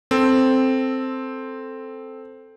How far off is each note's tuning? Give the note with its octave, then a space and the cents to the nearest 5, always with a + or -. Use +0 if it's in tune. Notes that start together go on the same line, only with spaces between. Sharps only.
C4 +0 A4 +0